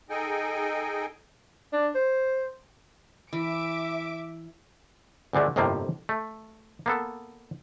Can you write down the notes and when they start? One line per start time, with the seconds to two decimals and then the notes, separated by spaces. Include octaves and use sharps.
0.10 D#4 G#4 A4 D#5 G5 G#5
1.73 D4
1.95 C5
3.33 E3 E5 D6 D7
5.33 D2 A#2 D3 G#3 A3
5.56 G1 F2 A2 C3 F3 A#3
6.09 A3
6.86 A#3 B3 A4